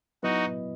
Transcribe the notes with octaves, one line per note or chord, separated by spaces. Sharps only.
F#3 B3 D#4 E4 F#4 B4 D#5